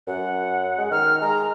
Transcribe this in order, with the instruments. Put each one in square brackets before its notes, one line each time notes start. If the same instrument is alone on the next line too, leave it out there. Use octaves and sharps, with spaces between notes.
[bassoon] F#2 [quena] F#5
[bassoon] G#3
[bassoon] D#3 [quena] F6
[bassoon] G#3 [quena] A#5